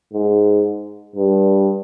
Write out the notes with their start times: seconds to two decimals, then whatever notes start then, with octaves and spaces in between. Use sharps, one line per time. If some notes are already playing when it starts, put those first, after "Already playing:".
0.13 G#2
1.16 G2